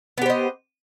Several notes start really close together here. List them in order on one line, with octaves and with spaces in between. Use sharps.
B3 G4 C5 D#5